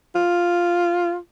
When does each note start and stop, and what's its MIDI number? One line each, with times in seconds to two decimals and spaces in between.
0.15 1.17 65